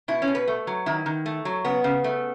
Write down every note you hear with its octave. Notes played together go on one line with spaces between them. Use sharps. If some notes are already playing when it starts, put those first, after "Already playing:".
B2 E4
C#4
B2
B4
A3
F#3
D#3 E4
D#3
A3
F#3
C#3 B3
C#3
A3